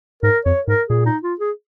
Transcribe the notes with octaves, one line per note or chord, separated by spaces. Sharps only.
G#2 A#4
F2 C#5
G#2 A#4
A#2 G#4
D#4
F4
G#4